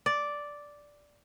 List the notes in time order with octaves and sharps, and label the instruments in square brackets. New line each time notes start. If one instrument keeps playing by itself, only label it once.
[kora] D5